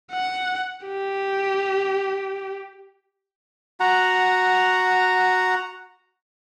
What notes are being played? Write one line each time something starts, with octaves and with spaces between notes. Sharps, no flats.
F#5
G4
F#4 F#5 A#5